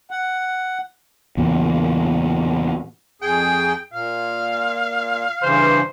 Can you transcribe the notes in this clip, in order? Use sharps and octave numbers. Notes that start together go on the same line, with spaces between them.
F#5
E2 A#2 C#3
F2 G#4 G5
A#2 F5
G2 C#3 E3 C5